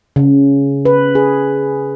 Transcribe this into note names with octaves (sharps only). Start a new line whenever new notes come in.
C#3
B4
G#4